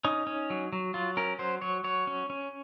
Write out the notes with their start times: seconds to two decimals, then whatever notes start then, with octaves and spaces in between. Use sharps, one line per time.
0.05 C#4 D#4
0.27 C#4
0.50 F#3
0.73 F#3
0.94 F#3 F4
1.17 C#4 A#4
1.39 F#3 C5
1.62 F#3 C#5
1.84 F#3 C#5
2.07 C#4
2.30 C#4